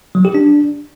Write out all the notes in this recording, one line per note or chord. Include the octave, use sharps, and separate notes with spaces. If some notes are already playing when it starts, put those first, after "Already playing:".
F#3
G4
D4